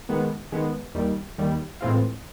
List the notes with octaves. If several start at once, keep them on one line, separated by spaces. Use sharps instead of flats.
D#3 G#3 B3
D#3 G#3 B3
D#2 D#3 G3
D#2 D#3 G3
A2 E3 G#3 C4 F4